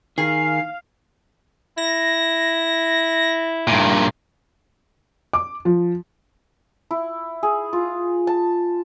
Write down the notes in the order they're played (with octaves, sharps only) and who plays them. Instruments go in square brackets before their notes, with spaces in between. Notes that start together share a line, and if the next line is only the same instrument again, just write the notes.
[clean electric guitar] D#3 [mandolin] G#4 [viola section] F5 [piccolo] C7
[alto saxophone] E4 [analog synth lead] A#6
[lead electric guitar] G2 A#2
[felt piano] D6
F3
[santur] E4
G#4
F4
A5